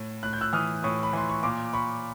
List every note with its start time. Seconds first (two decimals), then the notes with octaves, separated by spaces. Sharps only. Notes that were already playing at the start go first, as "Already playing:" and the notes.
Already playing: A2
0.23 A2 F#6
0.33 G6
0.41 E6 F#6
0.53 E3 D#6 F6
0.83 A2 C#6 D#6
1.03 B5
1.13 E3 C6
1.30 C#6
1.43 A#2 C6 D6
1.73 B5 C#6